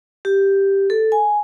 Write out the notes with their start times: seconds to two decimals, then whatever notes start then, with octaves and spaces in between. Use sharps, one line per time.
0.25 G4
0.90 A4
1.12 G#5